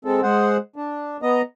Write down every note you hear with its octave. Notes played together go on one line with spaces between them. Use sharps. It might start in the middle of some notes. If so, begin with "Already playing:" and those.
G#3 C4 A4
G#3 G#4 C5 F#5
D4
B3 D#5 A#5